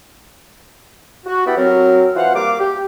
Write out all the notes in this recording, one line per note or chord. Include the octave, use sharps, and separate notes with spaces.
F#4
B3 E4 G4 D5 G5 B5
F#3 C4 A#4
E3 F4 C5 F5 F#5
G3 A#3 F5 D6
G4